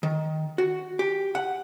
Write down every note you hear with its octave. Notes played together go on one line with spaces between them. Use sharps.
D#3
F#4
G4
F#5